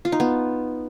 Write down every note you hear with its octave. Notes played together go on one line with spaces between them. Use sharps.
F4
D#4
B3